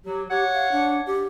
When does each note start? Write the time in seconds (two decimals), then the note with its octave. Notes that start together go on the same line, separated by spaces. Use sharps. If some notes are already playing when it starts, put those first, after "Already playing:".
0.05 F#3 G4
0.30 G4 C#5 F#5
0.54 F5
0.72 D4
1.07 G4